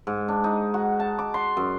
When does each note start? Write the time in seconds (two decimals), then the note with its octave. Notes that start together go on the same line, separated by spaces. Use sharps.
0.07 G#2
0.28 D4
0.44 D#4
0.74 F#4
1.00 A5
1.19 D6
1.34 C6
1.57 F#2